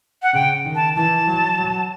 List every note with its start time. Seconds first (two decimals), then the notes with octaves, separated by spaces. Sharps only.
0.22 F#5
0.34 C#3 G5
0.65 D#3
0.75 A5
0.96 E3 A5
1.28 F#3
1.58 F#3